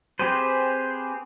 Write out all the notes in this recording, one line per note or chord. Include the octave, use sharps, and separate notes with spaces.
C4 G4 G#4 B4 C5